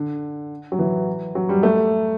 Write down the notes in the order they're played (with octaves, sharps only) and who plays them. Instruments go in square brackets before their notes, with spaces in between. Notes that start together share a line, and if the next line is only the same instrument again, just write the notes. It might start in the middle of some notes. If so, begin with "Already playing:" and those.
Already playing: [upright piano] D3
F#3
E3
F#3
G3
A3